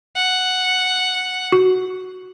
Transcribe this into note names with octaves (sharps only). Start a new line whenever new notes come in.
F#5
F#4